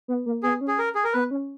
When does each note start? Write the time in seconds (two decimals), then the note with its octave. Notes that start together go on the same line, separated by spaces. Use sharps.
0.08 B3
0.26 A#3
0.43 B3 G#4
0.61 C#4
0.68 G#4
0.79 A#4
0.95 G#4
1.04 A#4
1.13 B3 B4
1.31 C#4